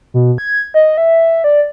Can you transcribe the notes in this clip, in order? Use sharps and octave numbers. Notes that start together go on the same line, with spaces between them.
B2
G#6
D#5
E5
D5